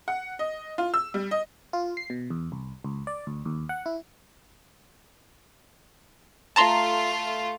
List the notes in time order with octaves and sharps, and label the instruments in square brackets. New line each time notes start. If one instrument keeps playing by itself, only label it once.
[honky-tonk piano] F#5
D#5
F4
E6
G3
D#5
[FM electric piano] F4
C7
B2
E2
C2
C#2
D5
D2
D#2
F#5
E4
[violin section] A3 F4 [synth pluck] A5 A#5 C6